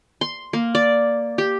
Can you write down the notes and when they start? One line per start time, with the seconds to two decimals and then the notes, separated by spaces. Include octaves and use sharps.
0.21 C6
0.53 A#3
0.75 D5
1.38 G4